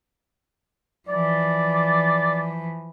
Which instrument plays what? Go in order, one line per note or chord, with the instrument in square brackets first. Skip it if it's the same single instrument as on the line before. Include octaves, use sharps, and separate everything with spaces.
[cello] E3 F3 [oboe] D5